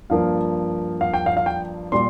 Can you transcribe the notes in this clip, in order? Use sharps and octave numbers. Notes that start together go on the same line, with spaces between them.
G2 F3 A#3 F5
F5
G5
F5
F5
G5
A#2 G3 C6